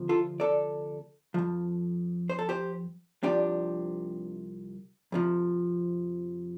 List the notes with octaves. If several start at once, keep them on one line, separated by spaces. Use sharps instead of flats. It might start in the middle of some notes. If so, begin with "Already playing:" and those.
Already playing: D2 C3 F3
F4 A4
A4 D5
F2 F3
C5
A4
G4 C5
C2 C3 F3 D4 G4
F2 C3 F3